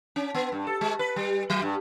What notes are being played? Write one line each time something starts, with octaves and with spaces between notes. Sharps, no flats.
C#4
B3
G2
A4
G#3
B4
G3
F#3
G2